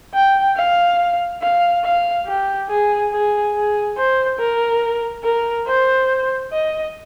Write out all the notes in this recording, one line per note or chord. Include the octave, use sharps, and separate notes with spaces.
G5
F5
F5
F5
G4
G#4
G#4
G#4
C5
A#4
A#4
C5
D#5